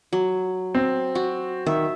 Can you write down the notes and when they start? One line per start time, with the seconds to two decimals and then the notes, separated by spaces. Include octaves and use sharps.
0.13 F#3
0.75 C4
1.15 F#4
1.66 D#3 E5